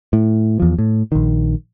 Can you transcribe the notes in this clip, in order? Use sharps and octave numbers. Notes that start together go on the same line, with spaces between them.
A2
E2 F3
A2
A#1 D#3